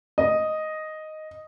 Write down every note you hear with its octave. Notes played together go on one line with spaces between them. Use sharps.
D#5